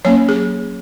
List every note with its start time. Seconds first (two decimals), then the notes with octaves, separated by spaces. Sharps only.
0.05 F#3 A#3 C#4 C#5
0.29 G#4